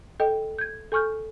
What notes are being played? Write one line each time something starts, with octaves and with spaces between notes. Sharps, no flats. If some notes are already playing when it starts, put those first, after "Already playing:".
A4 D#5 G5
G6 G#6
A4 G#5 C#6 F6 G6